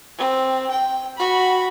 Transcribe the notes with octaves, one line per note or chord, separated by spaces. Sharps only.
C4
G5
F#4 B5